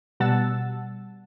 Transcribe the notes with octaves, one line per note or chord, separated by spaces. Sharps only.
B2 G3 F#5 A5 E6 A6